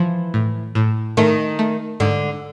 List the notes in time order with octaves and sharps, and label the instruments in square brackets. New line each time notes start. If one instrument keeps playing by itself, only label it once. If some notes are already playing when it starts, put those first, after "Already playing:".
Already playing: [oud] E3 [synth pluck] F3
[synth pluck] A2
A2
[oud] D#3 [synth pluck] A3
[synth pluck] A3
[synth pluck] G#2 [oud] D3